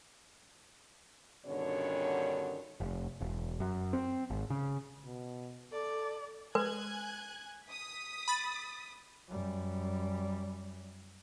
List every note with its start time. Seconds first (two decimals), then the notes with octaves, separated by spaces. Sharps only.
1.46 G2 B2 D3 D#3 C#4 C#5
2.80 F1
3.21 E1
3.60 F#2
3.93 C4
4.30 G#1
4.50 C#3
5.05 B2
5.72 A4 D5
6.55 G#3 B4 G#5 F#6 G#6
7.66 D#6 B6
8.28 B5 A6
9.28 F#2 G3